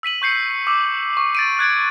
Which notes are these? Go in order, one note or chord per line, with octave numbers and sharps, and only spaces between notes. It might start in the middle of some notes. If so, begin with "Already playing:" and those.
E6 B6 D#7 F#7
C#6 G6 C7 C#7
D6 E6
C#6
A6 D7 D#7
F#6 G#6 A6 D7